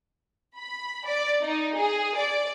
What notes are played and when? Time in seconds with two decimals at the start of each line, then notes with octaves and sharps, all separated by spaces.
0.58 B5
1.06 D5
1.42 D#4
1.76 G#4
2.16 D5